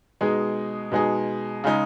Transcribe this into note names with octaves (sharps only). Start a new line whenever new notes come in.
B2 G#3 D#4 G#4
B2 G#3 D#4 G#4
C#3 G#3 D#4